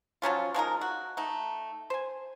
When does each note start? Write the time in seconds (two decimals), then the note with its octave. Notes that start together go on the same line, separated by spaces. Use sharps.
0.22 F3 F#3 C#4 F4
0.54 F3 G#3 D#4 A#4
0.81 F#4
1.17 A3 D#4
1.90 C5 G#5